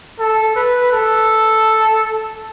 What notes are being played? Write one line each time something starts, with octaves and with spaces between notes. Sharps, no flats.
A4
B4
A4